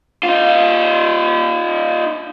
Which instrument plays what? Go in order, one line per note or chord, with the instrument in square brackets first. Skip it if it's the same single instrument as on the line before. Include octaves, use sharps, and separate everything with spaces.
[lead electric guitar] D#4 F4